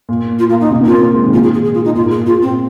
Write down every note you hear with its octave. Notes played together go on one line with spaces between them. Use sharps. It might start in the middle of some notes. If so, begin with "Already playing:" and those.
A#2
F4
A#3
D#4
C3
A#3
F4
C4
C4
G#3
D#3
C3
A#2 F4
G#4
G#4
G#4
F4
D#4
A#2 F4
A#2
G#4
A#2 F4
C4